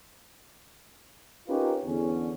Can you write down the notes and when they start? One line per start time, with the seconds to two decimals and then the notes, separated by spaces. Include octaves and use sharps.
1.48 C#4 D#4 F4 G4 A#4 B4
1.85 E2 D3 C#4